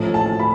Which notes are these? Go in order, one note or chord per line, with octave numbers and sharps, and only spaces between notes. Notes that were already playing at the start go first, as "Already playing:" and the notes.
Already playing: A1 A2 F3 A3
A5
B5